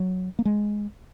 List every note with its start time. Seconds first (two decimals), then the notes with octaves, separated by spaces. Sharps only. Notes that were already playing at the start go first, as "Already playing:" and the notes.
Already playing: F#3
0.39 A#3
0.45 G#3